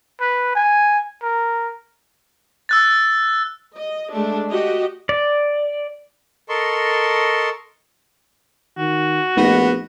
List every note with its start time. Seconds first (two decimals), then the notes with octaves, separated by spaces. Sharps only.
0.21 B4
0.55 G#5
1.22 A#4
2.69 E6 F#6 A6
3.74 D#5
4.11 G#3 A3 D4
4.49 F#4 G4 D#5
5.09 D5
6.49 A4 A#4 D#5 A5 C6 C#6
8.78 D#3 F#4
9.37 A#1 A3 B3 D#4 A#6